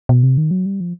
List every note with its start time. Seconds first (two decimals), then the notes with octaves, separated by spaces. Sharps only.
0.09 B2
0.23 C3
0.38 D#3
0.51 F#3
0.66 G3
0.80 F3